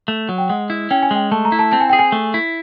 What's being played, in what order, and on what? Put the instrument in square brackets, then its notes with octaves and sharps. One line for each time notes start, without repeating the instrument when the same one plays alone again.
[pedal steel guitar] A3
F#3
[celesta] G5
[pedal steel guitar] G#3 [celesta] F#5
[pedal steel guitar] E4
[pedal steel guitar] C#4 [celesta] G5
[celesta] G#5
[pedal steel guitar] G#3 [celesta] G5
[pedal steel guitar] A3 [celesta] A5
[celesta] A#5
[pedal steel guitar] E4
[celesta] A5
[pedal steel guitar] C4 [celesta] A5
[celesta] G#5
[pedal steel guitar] G#4 [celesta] G5
[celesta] G#5
[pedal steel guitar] A3
E4